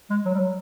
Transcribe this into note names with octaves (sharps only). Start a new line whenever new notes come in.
G#3
F#3
G3
F#3